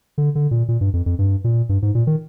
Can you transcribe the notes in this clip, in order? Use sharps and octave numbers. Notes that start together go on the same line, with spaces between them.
D3
D3
A#2
A#2
G2
F2
F2
G2
A#2
G2
G#2
A#2
D#3